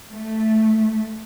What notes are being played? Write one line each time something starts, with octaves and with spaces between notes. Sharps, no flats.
A3